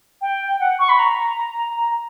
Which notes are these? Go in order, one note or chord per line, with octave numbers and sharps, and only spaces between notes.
G5
F#5
C#6
B5
A#5
A#5